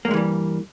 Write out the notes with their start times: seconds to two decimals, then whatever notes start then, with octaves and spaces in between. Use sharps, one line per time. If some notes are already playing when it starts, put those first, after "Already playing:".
0.05 A#3
0.08 G2
0.11 G#3
0.14 E3
0.16 G3